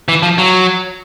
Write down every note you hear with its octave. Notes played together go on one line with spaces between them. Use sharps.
E3
F3
F#3